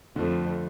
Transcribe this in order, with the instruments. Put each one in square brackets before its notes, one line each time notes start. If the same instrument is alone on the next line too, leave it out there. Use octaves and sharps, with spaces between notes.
[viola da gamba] F2 [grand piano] D3 F3 A3